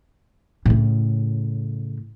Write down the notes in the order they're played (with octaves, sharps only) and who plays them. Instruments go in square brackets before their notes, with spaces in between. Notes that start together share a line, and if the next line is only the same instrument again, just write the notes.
[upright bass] A2 C#3